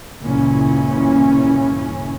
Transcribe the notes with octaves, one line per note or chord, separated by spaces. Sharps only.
C#2 G2 A#2 C#3 E3 C#4